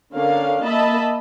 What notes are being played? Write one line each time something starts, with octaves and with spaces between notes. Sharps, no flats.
D3 C#4 D4 A#4 F5
A#3 D#5 E5 A5 B5